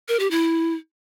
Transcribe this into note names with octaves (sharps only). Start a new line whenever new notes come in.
A#4
G4
E4